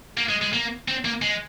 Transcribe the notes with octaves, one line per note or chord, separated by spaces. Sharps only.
A#3
G#3
G#3
A#3
C4
A#3
G#3